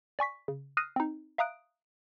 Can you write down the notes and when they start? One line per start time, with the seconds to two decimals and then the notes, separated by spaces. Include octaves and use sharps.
0.19 D5 G#5 C#6 B6
0.48 C#3
0.77 D#6 F6 F#6 A#6 C7 D#7
0.96 C4 D#4
1.38 E5 F5 A#5 D#6 F#6 D7